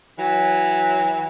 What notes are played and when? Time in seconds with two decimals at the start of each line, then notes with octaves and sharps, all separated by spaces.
0.19 E3 F#3